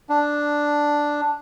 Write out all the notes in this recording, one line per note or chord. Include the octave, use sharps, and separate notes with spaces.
D4